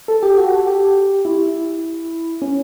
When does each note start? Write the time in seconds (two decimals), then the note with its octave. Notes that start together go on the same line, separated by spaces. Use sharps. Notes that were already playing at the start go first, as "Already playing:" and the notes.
0.08 A4
0.23 G4
0.38 F#4
0.52 A4
0.67 G4
1.25 E4
2.42 C#4